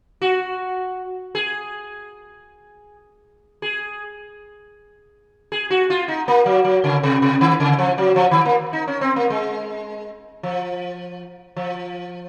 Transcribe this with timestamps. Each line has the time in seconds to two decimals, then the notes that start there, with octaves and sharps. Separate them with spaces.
0.21 F#4
1.35 G#4
3.62 G#4
5.52 G#4
5.70 F#4
5.90 F4
6.08 D#4
6.28 A#3
6.46 F#3
6.65 F#3
6.84 C#3
7.03 C3
7.22 C3
7.41 D#3
7.60 C#3
7.79 F3
7.98 F#3
8.16 F3
8.31 D#3
8.45 A#3
8.73 D#4
8.88 C#4
9.01 C4
9.16 A#3
9.30 G#3
10.43 F3
11.56 F3